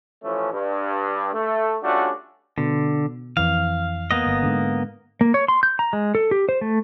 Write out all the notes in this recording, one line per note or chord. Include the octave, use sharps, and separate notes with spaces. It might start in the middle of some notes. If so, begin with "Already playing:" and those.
A1 E3 F3 A3 C#4
G2
A3
G3 A3 C#4 D4 F4 F#4
B2 D3
F2 E3 F5
A#3 B3 D#5
G1
G#2 D3
A#3
C#5
C6
G6
A#5
G#3
A4
G4
C5
A3